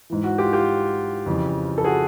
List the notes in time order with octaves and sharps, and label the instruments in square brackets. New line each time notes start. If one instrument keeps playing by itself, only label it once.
[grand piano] G#2 E3
F#4
F4 G4
F4 G4
F2 C#3 E3
A4
F#4 G#4